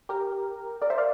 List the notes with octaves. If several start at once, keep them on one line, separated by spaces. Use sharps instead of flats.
G4 A#4
A#4 D5
C5 E5
D5 F5